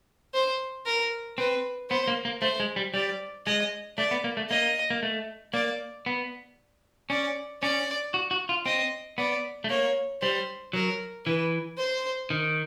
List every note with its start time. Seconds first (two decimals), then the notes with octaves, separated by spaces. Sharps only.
0.34 C5
0.86 A#4
1.38 C4 B4
1.90 B3 C5
2.08 A#3
2.25 A#3
2.42 A3 C5
2.60 G#3
2.76 G3
2.94 G3 D5
3.47 G#3 D#5
3.98 A3 D5
4.11 B3
4.24 A#3
4.37 A3
4.50 A#3 D#5
4.90 A#3
5.03 A3
5.54 A#3 D5
6.06 B3
7.10 C#4 D5
7.62 C#4 D5
8.14 F#4
8.31 F#4
8.49 F4
8.66 C4 D#5
9.18 B3 D5
9.64 A3
9.70 A#3 C#5
10.22 G3 C5
10.73 F#3 A#4
11.26 E3 B4
11.78 C5
12.30 D#3